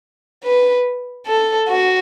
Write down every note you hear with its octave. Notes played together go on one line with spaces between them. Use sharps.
B4
A4
F#4